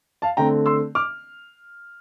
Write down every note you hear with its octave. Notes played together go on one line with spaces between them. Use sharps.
F5 A5
D3 A3 C4 G5 A#5
C6 E6
D6 F6